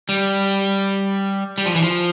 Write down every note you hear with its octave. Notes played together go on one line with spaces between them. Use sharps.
G3
G3
F3
E3
F3